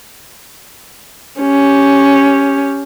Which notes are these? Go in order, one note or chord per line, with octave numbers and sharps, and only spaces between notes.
C#4 G4